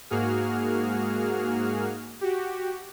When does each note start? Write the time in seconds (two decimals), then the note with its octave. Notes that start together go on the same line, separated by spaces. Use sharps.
0.10 G#2 A#3 F#4 G#4 F6
2.21 F#4 G4